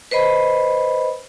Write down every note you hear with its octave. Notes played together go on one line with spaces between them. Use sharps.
B4 C5 D#5 B5